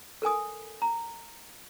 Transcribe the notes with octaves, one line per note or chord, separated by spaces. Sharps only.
A4 A#4 G#5 D#6
A#5